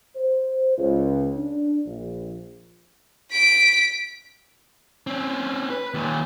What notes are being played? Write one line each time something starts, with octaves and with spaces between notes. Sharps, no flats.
C5
C#2
D4
A#1
B6 D7
C4 C#4
B4
D#2 A#2